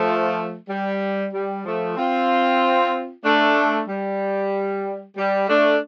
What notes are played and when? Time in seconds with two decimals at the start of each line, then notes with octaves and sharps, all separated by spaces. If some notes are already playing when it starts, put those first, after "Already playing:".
Already playing: F3 A3
0.69 G3
1.33 G3
1.65 F3 A3
1.97 C4 F4
3.24 A3 D4
3.88 G3
5.17 G3
5.48 A3 D4